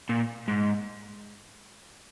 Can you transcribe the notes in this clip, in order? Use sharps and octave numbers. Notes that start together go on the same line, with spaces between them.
A#2
G#2